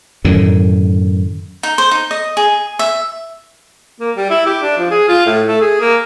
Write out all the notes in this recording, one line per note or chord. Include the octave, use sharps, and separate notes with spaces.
F#2 A2 D3 D#3
D#4
C5
D#4
D#5
G#4
E5
A#3
G3
E4
G4
D4
F3
G#4
F4
A2
A3
G#4
A#3